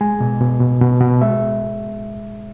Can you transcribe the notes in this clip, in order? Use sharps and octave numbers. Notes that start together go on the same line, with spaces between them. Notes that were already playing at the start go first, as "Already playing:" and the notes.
G#3 G#5
B2
B2
B2
B2
B2
G#3 E5